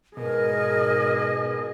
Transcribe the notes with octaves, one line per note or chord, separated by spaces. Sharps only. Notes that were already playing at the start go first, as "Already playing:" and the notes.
G#2 B2 G#4 A#4 D#5